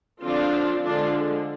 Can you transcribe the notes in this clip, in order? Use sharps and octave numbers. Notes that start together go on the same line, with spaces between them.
D3 F3 C4 D4 F4
D3 F3 G#3 D4 F4